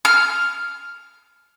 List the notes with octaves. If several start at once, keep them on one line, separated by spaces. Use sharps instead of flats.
F6